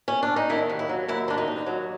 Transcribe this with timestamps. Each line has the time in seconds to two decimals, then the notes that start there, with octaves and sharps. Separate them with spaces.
0.08 C#4
0.23 D4
0.36 D#4
0.50 D#3 E4
0.69 D#2
0.79 E4
0.89 F#3
1.08 D#2 E4
1.28 D#3 D4
1.38 D#4
1.48 D#2
1.66 F#3